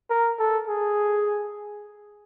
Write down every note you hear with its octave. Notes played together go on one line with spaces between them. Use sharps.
A#4
A4
G#4